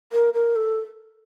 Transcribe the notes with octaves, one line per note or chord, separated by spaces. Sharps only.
A#4
A#4
A4